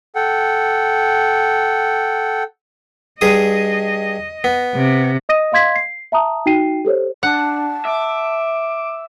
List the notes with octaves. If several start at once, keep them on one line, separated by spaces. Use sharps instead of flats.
A4 F#5 G5
G2 G#4 D#5 D#6
B3
C3
D#5 D#6 A#6 D#7
D#5 F5 C6 G#6 B6
C7
E5 A5 A#5 D#6
D#4 F#4 G5 C7 D#7
G4 A4 C5 C#5
D4 F#5 A5
E5 D6